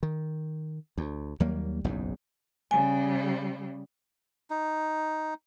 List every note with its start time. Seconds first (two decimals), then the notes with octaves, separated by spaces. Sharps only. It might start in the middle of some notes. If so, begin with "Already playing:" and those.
0.03 D#3
0.98 D2
1.40 D#2 F#3 G3 A#3
1.84 F#1 B1 E2 G#2
2.71 C#3 G3 G#5
4.50 D#4